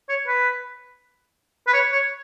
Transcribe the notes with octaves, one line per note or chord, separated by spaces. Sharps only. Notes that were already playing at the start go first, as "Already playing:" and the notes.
C#5
B4
B4
C#5
C#5